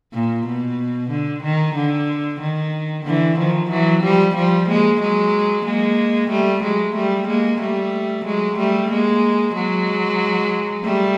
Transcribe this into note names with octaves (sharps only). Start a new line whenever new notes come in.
A#2
B2
D3
D#3
D3
D#3
D3 E3
D#3 F3
E3 F#3
F3 G3
F3 G3
G#3 A#3
F#3 G#3
G#3 A#3
G3 A3
F#3 G#3
G3 A3
G#3 A#3
G3 A3
F#3 G#3
G3 A3
G#3 A#3
F#3 G#3
G3 A3